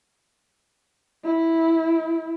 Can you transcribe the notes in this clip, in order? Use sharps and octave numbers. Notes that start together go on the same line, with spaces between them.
E4